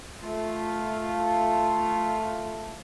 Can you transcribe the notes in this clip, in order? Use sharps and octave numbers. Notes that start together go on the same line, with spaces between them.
A3 F4